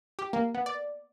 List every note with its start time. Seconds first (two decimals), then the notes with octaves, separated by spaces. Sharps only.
0.19 G4
0.33 A#3
0.54 B3
0.66 D5